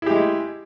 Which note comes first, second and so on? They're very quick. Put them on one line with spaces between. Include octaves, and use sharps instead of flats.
E4 G4 G#3